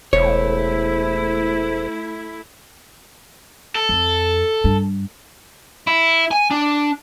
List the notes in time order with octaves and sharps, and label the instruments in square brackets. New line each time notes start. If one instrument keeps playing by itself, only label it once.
[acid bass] E1 [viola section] A3 E4 [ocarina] C5 [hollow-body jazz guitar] C#5
[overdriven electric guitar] A4
[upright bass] F2
G2 D4
[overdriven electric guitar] E4
G#5
D4